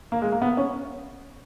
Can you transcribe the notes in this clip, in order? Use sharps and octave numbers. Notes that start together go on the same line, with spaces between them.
A#3
G#3
A#3
B3
C#4